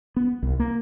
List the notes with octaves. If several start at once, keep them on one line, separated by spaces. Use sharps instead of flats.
B3
C2
A#3